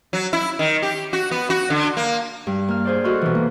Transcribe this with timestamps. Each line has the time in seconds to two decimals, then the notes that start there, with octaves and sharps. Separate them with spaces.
0.13 F#3
0.33 E4
0.59 D#3
0.82 G4
1.13 F#4
1.31 B3
1.50 F#4
1.70 D3
1.97 A#3
2.47 G2
2.68 A#3 F6
2.85 G#4 C5 D5
3.04 F#4 A4 D#5 C6 F6
3.22 B2 E3
3.35 A#3